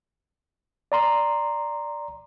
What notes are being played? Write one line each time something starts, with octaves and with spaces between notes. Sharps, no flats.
D5 A#5 C6